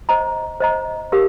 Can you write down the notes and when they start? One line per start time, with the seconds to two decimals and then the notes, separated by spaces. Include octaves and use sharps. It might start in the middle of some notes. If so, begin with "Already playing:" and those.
0.09 C5 D#5 A#5
0.61 C5 D#5 A#5
1.12 D#4 G4 A#4 F5